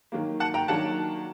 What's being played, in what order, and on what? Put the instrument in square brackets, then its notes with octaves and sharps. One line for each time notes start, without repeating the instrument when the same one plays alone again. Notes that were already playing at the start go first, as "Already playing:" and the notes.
[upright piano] D#3 F#3 A#3
F#5 A5
G5 A#5
D#3 F#3 A#3 D4 F#5 A5